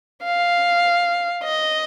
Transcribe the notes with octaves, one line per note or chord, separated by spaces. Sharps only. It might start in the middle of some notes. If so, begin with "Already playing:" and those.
F5
D#5